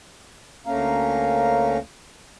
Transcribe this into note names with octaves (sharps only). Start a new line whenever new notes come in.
D2 A3 A#3 C#4 F5 A#5